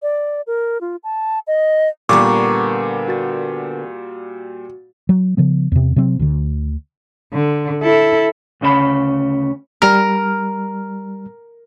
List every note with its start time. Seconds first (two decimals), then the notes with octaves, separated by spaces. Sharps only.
0.02 D5
0.47 A#4
0.81 F4
1.04 A5
1.47 D#5
2.09 A#2 D3 G3 B3 A#4 A#5 C#6 D6
3.08 F#4 A6
5.09 F#3
5.37 C#3 F3 B3
5.72 E2 C3
5.96 C3 F#3 C4
6.19 D2 D3
7.33 D3
7.82 E4 A4
8.61 D2 C#3 C#4 B4 B5
9.82 G3 A#4 F6